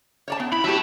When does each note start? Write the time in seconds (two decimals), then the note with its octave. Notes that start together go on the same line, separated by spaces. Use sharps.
0.28 C#5 D5 A5
0.40 B3
0.52 E4 B5
0.64 F#3 G4 E5 A5